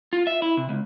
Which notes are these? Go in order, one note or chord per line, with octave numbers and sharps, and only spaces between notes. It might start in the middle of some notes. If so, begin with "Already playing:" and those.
F4
E5
E4
C3
C#2